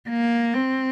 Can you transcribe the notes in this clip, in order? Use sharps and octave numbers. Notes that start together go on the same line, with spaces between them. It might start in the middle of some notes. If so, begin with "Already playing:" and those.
A#3
C4